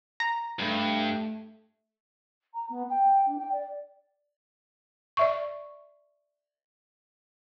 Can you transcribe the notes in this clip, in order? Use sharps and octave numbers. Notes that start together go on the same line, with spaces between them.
A#5
G2 A3
A#5
B3
G5
D4
G5
D5
D5 E5 C#6